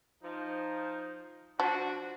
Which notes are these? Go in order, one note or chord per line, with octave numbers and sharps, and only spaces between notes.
F3 D#4
F3 D4 F#4